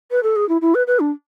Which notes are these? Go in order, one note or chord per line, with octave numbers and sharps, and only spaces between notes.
B4
A4
G#4
E4
E4
B4
B4
D4